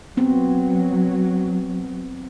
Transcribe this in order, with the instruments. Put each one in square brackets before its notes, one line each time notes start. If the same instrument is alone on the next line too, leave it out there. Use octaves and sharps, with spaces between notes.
[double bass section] F#3 [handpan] B3 C4